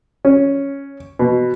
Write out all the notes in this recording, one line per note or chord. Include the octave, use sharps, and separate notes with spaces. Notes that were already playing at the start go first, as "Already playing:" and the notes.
C#4
B2